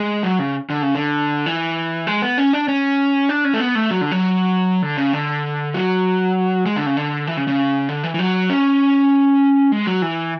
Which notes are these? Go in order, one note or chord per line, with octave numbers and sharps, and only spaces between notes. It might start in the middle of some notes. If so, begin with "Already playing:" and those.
Already playing: G#3
F#3
C#3
D3
C#3
D3
E3
G#3
B3
C#4
D4
C#4
D4
C#4
A3
B3
A3
F#3
D3
F#3
D3
C#3
D3
F#3
G#3
D3
C#3
D3
E3
C#3
C#3
D3
E3
E3
F#3
C#4
G#3
F#3
E3